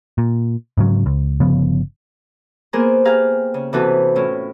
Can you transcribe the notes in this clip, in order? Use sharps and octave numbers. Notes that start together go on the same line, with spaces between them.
A#2
G#2 C#3 F#3
C#2
G1 C#3 F3 B3
A#3 B3 F4 G#4 A#4 C5
G4 G#4 F5 A#5 F6
C#3
C3 E3 B3 F#4 A4 B4
A2 C#4 E4 F4